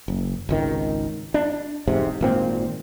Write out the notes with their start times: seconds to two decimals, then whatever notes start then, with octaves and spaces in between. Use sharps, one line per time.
0.08 F#1
0.49 G#1 C#2 D#3
1.34 D4
1.88 E1 G#2 C3
2.21 G#1 A#2 C4